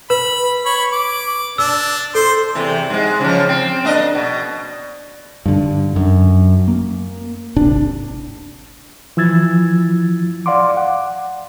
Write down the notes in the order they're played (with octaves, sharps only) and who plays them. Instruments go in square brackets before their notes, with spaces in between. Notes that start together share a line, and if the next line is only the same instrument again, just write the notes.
[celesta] B4 [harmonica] B5
[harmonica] C#5 B5
D6
[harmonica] D4 [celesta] E6
[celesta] A4 [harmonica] C5 C6
[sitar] E2 C3 E3
G#2 G#3
C#3 F3
C4
A#3 D4 D#5
B2
[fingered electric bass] G2 D3
F#2
A#3
D1 G#1 C3 D4
[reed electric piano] E3 F3 E6 G#6 A6
D5 F5 F#5 C6 D6
F#5